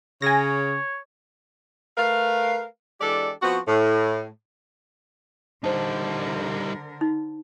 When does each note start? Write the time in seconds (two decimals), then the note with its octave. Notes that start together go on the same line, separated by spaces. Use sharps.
0.22 C#3 C#5 G#5 A#6
1.98 A3 A#4 B4 F5
3.01 E3 G#3 D4 G4 A4 D5
3.42 F3 B3 C4 F#4
3.67 A2
5.64 D3 G3 D#4 A#4 C5 A5
7.01 D#4